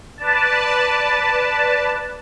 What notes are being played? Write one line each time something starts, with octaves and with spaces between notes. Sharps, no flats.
B4 D5 A5